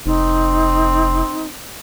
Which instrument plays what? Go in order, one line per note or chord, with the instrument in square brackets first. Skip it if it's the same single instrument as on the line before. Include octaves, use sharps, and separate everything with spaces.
[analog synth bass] F1 [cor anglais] C4 [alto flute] D#4